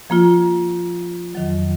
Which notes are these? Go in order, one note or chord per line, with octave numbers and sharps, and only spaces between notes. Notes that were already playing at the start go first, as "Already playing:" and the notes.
F3 A#3 F4
F2 D#3 F#3